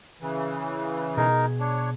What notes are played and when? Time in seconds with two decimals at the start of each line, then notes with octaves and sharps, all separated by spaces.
0.21 C#3 E3
1.17 B2 D#4 G#4 A#4
1.60 D4 C#5